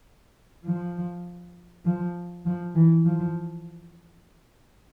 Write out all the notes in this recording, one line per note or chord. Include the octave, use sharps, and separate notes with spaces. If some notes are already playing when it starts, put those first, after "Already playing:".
F3
F3
F3
E3
F3